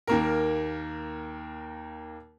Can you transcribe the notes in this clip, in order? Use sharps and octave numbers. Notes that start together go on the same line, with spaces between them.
D#2 A#3 A#4